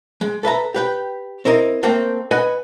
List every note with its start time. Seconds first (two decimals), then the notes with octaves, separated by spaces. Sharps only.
0.21 G#3
0.43 A4 B4 E5 A#5
0.74 G4 B4 G5
1.45 C4 E4 A#4 D#5
1.83 A3 A#3 C4 G5
2.31 B4 D#5 F#5 G#5